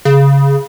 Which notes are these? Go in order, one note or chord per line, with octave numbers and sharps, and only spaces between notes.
C#3